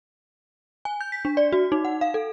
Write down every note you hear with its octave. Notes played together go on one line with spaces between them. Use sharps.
G#5
G6
B6
D4
D5
F#4
D#4
F#5
F5
A4